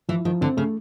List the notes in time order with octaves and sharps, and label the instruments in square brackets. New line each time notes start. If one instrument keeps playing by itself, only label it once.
[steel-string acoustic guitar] E3 [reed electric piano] F3
[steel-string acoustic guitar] D#3 [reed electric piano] F3
[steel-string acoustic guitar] D3 [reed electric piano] C4
[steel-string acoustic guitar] C#3 [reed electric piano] A3